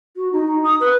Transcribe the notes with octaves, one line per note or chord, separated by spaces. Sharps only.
F#4
D#4
D#6
B4